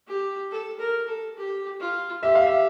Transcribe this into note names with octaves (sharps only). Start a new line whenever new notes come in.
G4
A4
A#4
A4
G4
F4
G4 E5
F5
E5